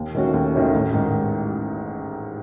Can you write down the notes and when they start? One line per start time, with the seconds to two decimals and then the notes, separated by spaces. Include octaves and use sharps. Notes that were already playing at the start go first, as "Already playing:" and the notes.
Already playing: D#2
0.15 D#3 A3 C#4 F#4
0.34 D#2
0.54 D#3 A3 C#4 F#4
0.74 A1
0.94 G#2 D#3